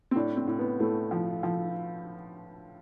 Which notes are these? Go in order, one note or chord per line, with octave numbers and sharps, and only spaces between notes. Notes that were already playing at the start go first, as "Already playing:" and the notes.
C4
A2 D4
C4
A2
B3
A2 A3
F3
F3